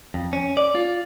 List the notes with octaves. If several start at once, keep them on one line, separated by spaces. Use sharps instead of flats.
F2
C#4
D5
F4